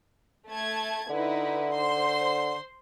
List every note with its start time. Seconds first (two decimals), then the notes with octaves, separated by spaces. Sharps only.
0.48 A3 A5 G#6
1.09 D3 D#4 E4 B4
1.75 C5 C6